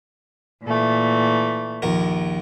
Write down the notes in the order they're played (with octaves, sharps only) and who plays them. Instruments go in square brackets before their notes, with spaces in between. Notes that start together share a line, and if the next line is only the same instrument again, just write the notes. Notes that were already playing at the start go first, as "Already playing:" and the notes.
[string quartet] A#2 E3 A3
[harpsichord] A#1 D#2 A#4